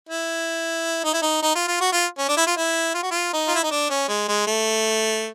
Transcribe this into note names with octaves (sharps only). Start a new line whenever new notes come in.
E4
D#4
E4
D#4
D#4
F4
F4
F#4
F4
C#4
D4
E4
F4
E4
F4
F#4
F4
D#4
F4
E4
D#4
D4
C#4
G#3
G#3
A3